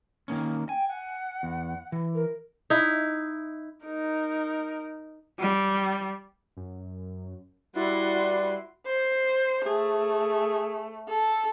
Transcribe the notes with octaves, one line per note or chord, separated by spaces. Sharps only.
D#3 A#3 C#4
G5 G#5
F#5
E2
E3
A#4
D#4 E4
D#4 A#4
G3
F#2
G3 E4 F#4 B4 D5 C6
C5
A3 G#4
A4